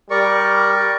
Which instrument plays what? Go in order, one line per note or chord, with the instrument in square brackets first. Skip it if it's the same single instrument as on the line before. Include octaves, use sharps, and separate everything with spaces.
[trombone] G3 [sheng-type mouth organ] A#4 D5 C#6